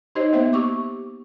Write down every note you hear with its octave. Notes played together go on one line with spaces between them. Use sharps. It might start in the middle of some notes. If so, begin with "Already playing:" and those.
D#4 G4 C5 C#5 D#5
A#3 B3 C5 E5
G4 C#6 D6